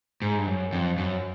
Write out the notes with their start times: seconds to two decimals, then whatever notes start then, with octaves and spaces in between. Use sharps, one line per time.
0.22 G#2
0.38 G2
0.47 F#2
0.73 F2
0.98 F#2